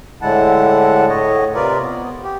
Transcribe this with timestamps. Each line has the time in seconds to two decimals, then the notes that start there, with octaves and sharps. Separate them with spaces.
0.22 A2 D3 G#3 E4 F#5 A5
1.09 A2 C#5 D#5
1.55 C3 F4 A#4 B4 D5
1.80 B3
2.24 G4